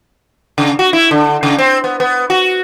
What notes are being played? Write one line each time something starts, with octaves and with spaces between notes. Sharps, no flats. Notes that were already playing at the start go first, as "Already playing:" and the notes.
C#3
F#4
E4
D3
C#3
C4
B3
B3
F#4